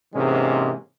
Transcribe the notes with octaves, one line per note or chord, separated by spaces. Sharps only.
G#2 C3 E3 G#3 A#3 C#4